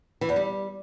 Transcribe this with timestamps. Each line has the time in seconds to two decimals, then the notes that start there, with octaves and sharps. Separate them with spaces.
0.21 E3
0.29 E2
0.36 G3